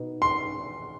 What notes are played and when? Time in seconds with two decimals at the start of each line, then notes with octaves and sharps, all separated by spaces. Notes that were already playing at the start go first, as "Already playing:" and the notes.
Already playing: B2 D#4
0.22 C6